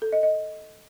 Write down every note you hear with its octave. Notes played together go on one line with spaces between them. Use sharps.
A4
D#5
D#5